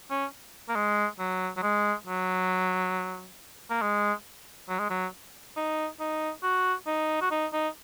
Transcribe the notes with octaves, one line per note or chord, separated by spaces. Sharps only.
C#4
A#3
G#3
F#3
F#3
G#3
F#3
A#3
G#3
F#3
G#3
F#3
D#4
D#4
F#4
D#4
F#4
D#4
D#4